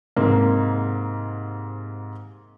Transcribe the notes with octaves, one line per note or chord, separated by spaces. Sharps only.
G#2 C3 A#3